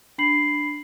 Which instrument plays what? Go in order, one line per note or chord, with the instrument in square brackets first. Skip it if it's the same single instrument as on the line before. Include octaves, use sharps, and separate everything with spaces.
[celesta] D4 B5 C7 F#7